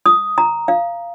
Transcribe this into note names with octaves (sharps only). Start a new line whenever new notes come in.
D#6
A#5
F5